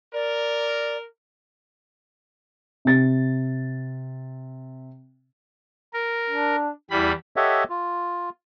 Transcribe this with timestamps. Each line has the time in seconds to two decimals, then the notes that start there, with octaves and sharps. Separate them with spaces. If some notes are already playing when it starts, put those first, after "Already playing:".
0.13 A#4 D5
2.85 C3 A6
5.93 A#4
6.30 D4
6.90 E2 G3 E4 B5
7.36 G4 A4 C#5 D#5 E5 F#5
7.70 F4